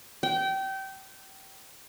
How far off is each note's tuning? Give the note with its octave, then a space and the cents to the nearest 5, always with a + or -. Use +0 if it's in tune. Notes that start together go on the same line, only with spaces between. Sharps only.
G5 -25